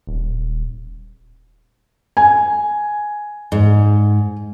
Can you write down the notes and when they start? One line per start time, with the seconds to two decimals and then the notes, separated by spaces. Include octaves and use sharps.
0.07 D#1
2.17 G#5
3.52 G#2